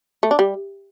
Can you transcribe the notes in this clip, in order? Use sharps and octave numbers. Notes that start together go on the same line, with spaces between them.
A3
D4
G3